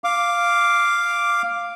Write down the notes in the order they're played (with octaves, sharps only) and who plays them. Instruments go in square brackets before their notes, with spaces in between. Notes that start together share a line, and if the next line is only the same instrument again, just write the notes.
[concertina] F5 D6